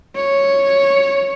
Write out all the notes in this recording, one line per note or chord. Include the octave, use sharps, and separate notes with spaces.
C#5